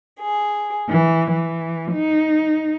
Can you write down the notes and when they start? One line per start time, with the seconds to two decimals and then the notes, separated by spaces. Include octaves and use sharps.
0.21 G#4
0.89 E3
1.30 E3
1.92 D#4